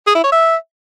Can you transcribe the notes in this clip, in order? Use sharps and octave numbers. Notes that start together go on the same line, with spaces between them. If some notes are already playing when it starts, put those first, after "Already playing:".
G#4
E4
C#5
E5